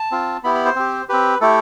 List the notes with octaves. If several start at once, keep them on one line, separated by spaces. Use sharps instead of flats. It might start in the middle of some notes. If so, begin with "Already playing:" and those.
Already playing: A5
C4 F4
B3 E4 G4 B5
B5
C5
C4 G4
C4 G4 B4
A3 E4 G4 A4